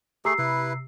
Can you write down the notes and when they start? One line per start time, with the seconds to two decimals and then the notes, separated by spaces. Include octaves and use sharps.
0.25 A3 G4 G#4 A#5 E6 C7
0.38 C3 E4 B4